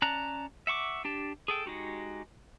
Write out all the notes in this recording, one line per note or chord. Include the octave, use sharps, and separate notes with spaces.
C#4 D5 A5 A#5 F#6
E5 F#5 C#6 D6
D4 G4 A5
G#4 A4 G5
G#3 D#4 F#4 G4